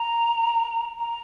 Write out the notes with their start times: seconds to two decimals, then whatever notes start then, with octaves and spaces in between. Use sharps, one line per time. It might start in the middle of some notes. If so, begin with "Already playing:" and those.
Already playing: A#5
0.99 A#5